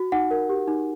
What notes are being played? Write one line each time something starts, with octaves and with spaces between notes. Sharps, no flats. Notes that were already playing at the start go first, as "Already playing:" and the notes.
Already playing: F#4
D#4 F#5
A#4
G4
D#4